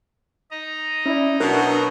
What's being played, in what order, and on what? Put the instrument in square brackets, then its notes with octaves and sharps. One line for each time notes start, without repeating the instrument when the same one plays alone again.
[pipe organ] D#4 D#5 A#5
[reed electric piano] C#4 D5 [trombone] E4
[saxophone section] B2 [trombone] F#3 [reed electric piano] D4 A#4